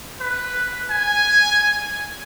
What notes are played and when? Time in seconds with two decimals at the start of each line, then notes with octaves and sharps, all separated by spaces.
0.20 B4
0.91 G#5